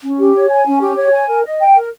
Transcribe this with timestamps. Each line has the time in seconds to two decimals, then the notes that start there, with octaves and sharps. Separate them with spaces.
0.03 C#4
0.19 G4
0.34 C#5
0.51 G#5
0.65 C#4
0.81 G4
0.97 C#5
1.12 G#5
1.28 A#4
1.45 D#5
1.60 G5
1.75 A#4